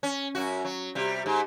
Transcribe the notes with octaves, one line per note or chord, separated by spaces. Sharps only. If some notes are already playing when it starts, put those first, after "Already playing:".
C#4
F#2 F#4
F#3
C3 G3
G#2